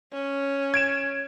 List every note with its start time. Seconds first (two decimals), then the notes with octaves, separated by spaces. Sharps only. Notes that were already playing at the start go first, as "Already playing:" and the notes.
0.13 C#4
0.74 G#6 D7 E7